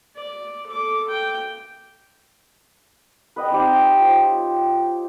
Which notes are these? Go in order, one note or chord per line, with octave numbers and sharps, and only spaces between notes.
D5
A4 D6
G5
B4 D#5 G5
C4 D#4 G4
F4 C5 C#5